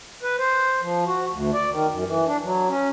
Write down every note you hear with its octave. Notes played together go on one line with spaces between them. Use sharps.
B4
C5
F3
F#4
D2
D5
D#3
F#2
E3
D4
F#3
C#4